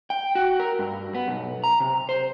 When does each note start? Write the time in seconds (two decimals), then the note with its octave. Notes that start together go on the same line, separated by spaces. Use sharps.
0.10 G5
0.35 F#4
0.60 A#4
0.79 G2
1.15 B3
1.28 B1
1.64 A#5
1.80 C3
2.09 C5